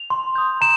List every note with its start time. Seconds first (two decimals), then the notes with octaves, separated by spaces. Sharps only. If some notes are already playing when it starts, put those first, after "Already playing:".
Already playing: F7
0.10 C6
0.36 D#6 G6
0.61 A#5 E7